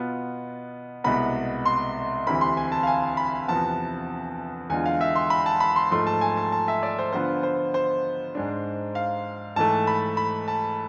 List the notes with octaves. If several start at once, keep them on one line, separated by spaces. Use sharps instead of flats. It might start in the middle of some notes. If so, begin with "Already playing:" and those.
Already playing: B2 B3 F4
C2 B2 G#3 B3 B5
C6
D2 C3 E3 B5
C6
G#5
A5
F5
G#5
B5
E2 C3 F3 B3 A5
E2 D3 G#3 D4 F4 G#5
F5
E5
C6
B5
A5
B5
C6
G#2 F3 A3 C6
A5
G#5
A5
A5
E5
D5
C5
D3 F3 B3 F4 C5
C5
C5
G#2 G#3 D4
F5
G#2 E3 A3 A5
B5
B5
A5